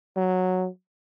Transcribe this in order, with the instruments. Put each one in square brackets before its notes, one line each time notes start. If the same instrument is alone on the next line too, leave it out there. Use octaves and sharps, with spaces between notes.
[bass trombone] F#3